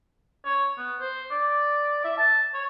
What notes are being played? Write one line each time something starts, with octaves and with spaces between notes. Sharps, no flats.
C#5
B3
C5
D5
E5
A5
C#5